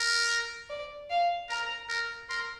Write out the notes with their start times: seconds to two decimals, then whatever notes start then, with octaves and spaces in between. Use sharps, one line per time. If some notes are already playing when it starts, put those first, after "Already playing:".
Already playing: A#4
0.69 D5
1.10 F5
1.49 A#4 A#5
1.89 A#4
2.29 A#4 C6